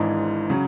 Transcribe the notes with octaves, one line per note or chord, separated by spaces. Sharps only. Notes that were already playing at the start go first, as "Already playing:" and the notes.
Already playing: G#1 G#2 E3 G#3 D4
C#3 F#3